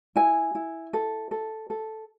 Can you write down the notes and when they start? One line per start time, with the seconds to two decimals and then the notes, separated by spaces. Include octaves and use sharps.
0.16 E4 G#5
0.55 E4
0.93 A4
1.31 A4
1.70 A4